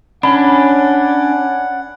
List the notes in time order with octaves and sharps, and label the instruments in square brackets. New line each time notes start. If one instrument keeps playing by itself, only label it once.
[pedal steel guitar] C#4 D4 [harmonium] F#5 [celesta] B5